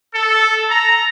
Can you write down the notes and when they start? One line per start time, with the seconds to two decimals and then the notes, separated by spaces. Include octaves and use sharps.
0.14 A4
0.71 A#5